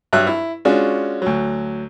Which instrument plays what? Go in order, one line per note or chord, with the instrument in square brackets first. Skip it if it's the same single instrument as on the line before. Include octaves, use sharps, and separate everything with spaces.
[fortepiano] G2 F#3 E5 F#6
E4
G#3 C#4 D4 F4 F#4
D2 F#3